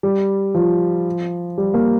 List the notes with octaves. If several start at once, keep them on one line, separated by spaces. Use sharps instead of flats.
G3
F3
G3
A#3